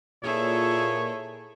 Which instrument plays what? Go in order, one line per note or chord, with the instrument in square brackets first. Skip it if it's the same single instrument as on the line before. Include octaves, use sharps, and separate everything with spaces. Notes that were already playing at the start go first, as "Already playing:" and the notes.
[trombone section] A#2 [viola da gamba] E4 G#4 A4 [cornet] C#5